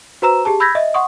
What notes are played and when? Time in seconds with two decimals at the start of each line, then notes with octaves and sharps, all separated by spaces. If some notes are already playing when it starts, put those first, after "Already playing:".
0.22 F#4 B4 C5 A#5 E6 E7
0.45 G4 G#4 A5
0.60 B5 E6 G6 G#6 A#6 B6
0.75 D#5 E5
0.94 F#5 C6 C#6 D#6